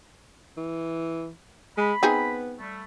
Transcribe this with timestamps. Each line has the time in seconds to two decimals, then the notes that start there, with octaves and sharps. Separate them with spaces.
0.57 E3
1.78 G#3 B5
2.03 B3 C4 D#4 G#4
2.58 G3 A3